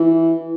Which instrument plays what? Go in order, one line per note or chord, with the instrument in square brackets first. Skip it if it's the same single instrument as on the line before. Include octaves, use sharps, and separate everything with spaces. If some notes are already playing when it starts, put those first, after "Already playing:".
Already playing: [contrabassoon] E3